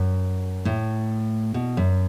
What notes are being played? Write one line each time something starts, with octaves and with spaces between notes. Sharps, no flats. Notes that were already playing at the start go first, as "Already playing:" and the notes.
Already playing: F#2
A2
B2
F#2